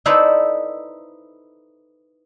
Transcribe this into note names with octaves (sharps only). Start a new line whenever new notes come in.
D#4 E4 A4 B4 C5 D5